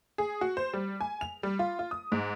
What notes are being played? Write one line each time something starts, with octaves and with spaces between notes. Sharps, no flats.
G#4
F#4
C5
G3
G#5
F7
G3
F4
F4
D#6
G#2